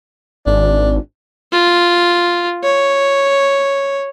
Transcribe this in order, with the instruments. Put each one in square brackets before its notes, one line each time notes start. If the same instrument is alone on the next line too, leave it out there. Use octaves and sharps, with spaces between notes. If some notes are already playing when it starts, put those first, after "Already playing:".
[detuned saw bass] G#1 [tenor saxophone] D4
[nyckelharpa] F4
C#5